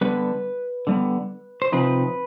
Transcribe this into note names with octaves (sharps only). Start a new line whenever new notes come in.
D3 G3 B3 B4
D3 G3 B3
C5
C3 F3 C4 D#4 B4